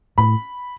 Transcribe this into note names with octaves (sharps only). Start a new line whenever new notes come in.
A2 B5